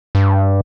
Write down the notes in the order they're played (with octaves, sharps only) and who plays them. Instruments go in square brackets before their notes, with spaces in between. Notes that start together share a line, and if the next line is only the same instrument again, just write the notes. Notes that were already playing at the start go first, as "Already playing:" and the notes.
[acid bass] G2